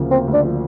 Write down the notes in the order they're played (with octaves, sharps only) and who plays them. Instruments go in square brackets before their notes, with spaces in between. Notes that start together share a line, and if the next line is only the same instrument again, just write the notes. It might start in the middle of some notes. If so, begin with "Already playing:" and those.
Already playing: [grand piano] D2 C#3 F3 A#3
[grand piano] A#3 [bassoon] C4
[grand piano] D2
[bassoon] D4
[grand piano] F3